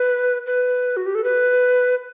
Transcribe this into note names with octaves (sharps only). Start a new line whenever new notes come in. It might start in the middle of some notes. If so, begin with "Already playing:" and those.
Already playing: B4
B4
F#4
G4
A4
B4